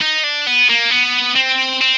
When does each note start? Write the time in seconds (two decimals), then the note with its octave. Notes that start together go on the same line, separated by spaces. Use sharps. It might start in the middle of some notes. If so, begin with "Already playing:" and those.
0.01 D#4
0.24 D4
0.47 B3
0.69 A#3
0.91 B3
1.36 C4
1.81 C4